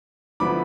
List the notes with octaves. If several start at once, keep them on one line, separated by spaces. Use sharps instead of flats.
D3 F3 B3 E4 B5 D6